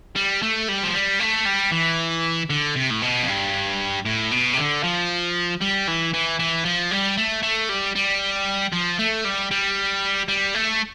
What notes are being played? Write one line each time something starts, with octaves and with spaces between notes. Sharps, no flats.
G3
A3
G3
F3
G3
A3
G3
E3
D3
C3
A2
B2
F2
G2
A2
B2
C3
D3
F3
G3
E3
E3
E3
F3
G3
A3
A3
G3
G3
F3
A3
G3
G3
G3
A3